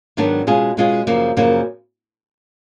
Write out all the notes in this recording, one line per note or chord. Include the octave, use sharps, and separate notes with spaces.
G#2 D#3 F#3 B3 D4
B2 G#3 C#4 F4 G#4
B2 G#3 C#4 F4 G#4
F#2 C#3 F3 A#3
F#2 C#3 F3 A#3